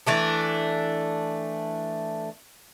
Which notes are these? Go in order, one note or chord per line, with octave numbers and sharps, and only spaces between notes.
E3 A3 D4